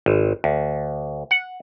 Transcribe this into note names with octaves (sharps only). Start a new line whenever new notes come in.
G#1
D2
F#5